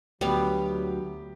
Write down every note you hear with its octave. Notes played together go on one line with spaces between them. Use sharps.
D2 F#3 G3 B3 G4 F5